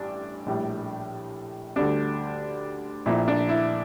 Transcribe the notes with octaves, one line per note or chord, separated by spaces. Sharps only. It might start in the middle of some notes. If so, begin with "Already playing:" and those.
Already playing: A1 G2 G3 D4
A#1 A2 G3
D2 D3 G3 D4
A#1 A#2 F3 E4
D4
E4